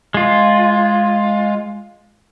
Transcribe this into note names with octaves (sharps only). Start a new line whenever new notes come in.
G#3 F4